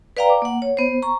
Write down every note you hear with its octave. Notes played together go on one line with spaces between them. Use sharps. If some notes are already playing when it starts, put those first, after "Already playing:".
B4 D5 F5 G5 A#5
D6
A#3 F#5
C#5
B3 C5
A#5 C#6